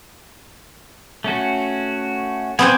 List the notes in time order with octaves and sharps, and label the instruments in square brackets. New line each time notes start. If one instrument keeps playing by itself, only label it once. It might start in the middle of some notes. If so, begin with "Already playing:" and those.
[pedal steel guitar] A3 C#4 F#4
[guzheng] B3 C4 G5 [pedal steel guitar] D5 G#5